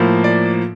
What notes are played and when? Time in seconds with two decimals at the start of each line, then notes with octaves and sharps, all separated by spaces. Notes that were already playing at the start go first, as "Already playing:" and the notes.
Already playing: A2 F3 A#3
0.24 D5